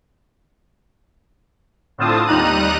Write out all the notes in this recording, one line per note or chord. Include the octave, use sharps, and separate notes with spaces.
A2 D3 C4 F4 A5 D#6
D#2 G3 D#4 A#5 F#6 D#7